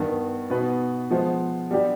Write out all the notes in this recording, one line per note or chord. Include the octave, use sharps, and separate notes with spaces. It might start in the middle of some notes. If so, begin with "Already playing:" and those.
Already playing: G2 D#3 B3
B2 B3 D#4 B4
F3 G#3 B3 F4 C5
G3 B3 D4 G4